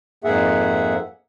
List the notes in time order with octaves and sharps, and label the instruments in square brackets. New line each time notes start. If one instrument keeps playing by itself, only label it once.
[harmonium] F2 G#2 A#3 G#4 E5 F#5